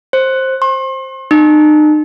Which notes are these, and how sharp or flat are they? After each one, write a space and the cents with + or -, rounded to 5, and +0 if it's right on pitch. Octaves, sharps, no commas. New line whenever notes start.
C5 +10
C6 +40
D#4 -40